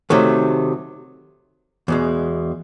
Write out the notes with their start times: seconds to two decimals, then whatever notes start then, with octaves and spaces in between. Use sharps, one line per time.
0.10 C3 D#3 F#3 A3
1.88 E2 B2 G#3